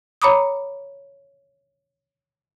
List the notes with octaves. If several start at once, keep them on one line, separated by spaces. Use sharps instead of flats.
C#5 A#5 B5 D6 D#6